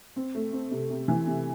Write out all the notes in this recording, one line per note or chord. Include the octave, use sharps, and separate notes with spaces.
C4
A3
C4
C3
C3
E3
C3